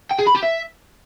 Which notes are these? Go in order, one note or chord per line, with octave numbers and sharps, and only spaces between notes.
G5
G#4
B5
G4
E5